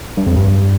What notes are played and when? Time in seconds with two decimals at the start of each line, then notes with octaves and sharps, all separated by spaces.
0.17 G2
0.27 F2
0.36 G2